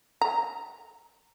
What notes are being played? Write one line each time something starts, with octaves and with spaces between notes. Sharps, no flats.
A#5